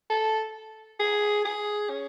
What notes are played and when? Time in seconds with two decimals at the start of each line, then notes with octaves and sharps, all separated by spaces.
0.10 A4
1.00 G#4
1.45 G#4
1.89 C#4